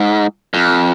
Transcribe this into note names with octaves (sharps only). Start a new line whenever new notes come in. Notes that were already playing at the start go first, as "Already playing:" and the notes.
Already playing: G#2
F2